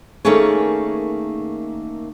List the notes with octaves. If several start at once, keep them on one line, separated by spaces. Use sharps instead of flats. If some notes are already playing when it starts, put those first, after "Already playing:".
D#3 A3 A#3 C#4 G#4 C#5